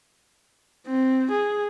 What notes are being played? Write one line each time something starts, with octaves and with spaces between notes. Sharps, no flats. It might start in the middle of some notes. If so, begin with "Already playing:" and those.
C4
G#4